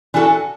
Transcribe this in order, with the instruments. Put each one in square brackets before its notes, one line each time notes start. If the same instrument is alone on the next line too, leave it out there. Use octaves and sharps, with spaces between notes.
[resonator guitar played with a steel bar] E3 D4 F#4 A4